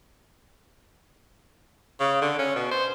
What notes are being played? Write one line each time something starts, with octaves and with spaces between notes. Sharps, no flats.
C#3
D3
C#4
B2
C5